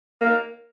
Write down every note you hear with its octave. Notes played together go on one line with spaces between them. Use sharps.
A#3